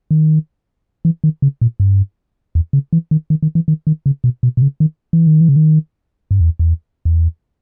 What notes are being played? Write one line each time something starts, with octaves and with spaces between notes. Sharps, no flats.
D#3
E3
D#3
C#3
A#2
G2
E2
C#3
E3
D#3
D#3
D#3
E3
D#3
D#3
C#3
B2
B2
B2
C#3
D#3
E3
D#3
E3
C#3
D#3
G2
E2
E2
E2